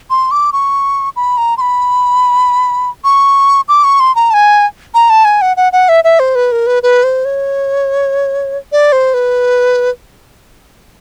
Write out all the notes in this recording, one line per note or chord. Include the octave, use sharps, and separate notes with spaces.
C6
D6
C#6
B5
A#5
C6
B5
C#6
D6
C#6
C6
A#5
A5
G#5
A#5
A5
G#5
F#5
F#5
F#5
E5
E5
C5
B4
A#4
B4
B4
C5
C#5
D5
C5
B4